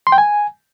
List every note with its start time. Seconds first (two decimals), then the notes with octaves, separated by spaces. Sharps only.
0.07 C6
0.12 G5
0.18 G#5